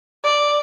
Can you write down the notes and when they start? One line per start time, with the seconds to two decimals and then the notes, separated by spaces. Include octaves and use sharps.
0.24 D5